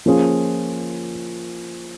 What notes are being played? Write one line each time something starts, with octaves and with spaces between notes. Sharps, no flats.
F3 A#3 C#4 F4 G#4